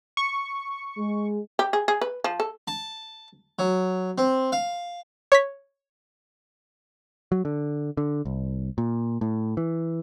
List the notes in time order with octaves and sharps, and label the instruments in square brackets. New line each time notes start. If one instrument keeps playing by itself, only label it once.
[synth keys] C#6
[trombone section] G#3
[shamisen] G4
G#4
G#4
B4
F3
A4
[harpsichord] A5
F#3
C4
F5
[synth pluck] C#5 C#6 B6
[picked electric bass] F#3
D3
D3
C2
A#2
A2
E3